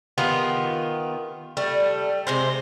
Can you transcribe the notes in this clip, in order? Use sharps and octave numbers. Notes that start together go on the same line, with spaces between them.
D#3 B3 F4 G4
G3 A3
C3 G#3 C5